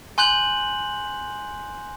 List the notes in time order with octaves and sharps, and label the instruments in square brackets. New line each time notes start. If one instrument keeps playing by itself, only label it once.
[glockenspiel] G#5 C6 F#6 G6 F#7